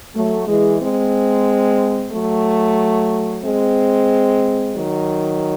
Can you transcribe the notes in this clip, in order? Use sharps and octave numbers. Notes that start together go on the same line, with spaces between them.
F#3 A3
E3 G#3
G#3 C4
F#3 A3
G#3 C4
D#3 F#3